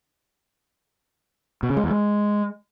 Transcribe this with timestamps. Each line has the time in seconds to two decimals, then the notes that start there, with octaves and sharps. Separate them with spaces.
1.63 B2
1.70 C#3
1.77 G#3
1.84 E2
1.91 G#3